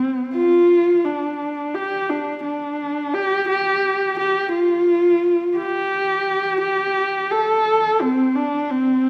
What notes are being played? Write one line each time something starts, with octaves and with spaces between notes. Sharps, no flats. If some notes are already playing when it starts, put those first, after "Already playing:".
Already playing: C4
F4
D4
G4
D4
D4
G4
G4
G4
F4
G4
G4
A4
C4
D4
C4